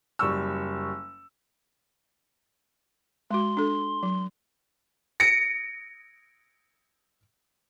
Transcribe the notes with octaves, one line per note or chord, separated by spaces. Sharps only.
F#1 G3 C#6 E6
G#3 F#4 C6
D4 A4
F#3
A#6 C#7 D7